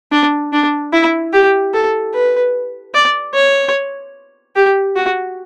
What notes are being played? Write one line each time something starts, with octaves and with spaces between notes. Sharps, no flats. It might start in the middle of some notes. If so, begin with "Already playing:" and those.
D4
D4
E4
G4
A4
B4
D5
C#5
G4
F#4